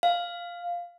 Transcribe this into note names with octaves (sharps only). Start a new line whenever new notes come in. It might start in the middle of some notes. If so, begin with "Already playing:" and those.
F5